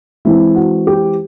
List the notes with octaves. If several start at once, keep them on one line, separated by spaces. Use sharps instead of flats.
E3 G#3 C4 E4
F#4
G4